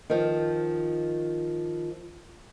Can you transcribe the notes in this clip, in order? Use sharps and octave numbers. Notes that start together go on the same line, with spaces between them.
D#3 F3